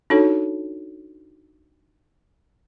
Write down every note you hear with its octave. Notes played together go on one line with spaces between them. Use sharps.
D4 D#4 F#4 A4 C#5